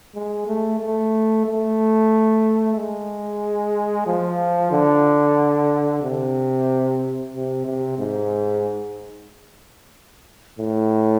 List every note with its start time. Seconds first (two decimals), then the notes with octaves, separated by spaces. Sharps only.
0.15 G#3
0.47 A3
0.80 A3
1.45 A3
2.76 G#3
4.07 F3
4.71 D3
6.02 C3
7.34 C3
7.66 C3
7.98 G#2
10.59 A2